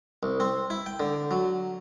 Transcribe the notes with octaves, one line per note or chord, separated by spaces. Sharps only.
C2
C4
E4
G5
D3
F#3